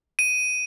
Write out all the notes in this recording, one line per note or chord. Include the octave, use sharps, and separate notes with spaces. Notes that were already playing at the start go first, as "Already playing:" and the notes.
D#7